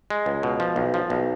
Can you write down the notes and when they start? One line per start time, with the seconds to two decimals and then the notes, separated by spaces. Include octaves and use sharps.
0.10 G#3
0.26 C#2
0.43 B2
0.60 F3
0.76 B1
0.94 F3
1.10 B1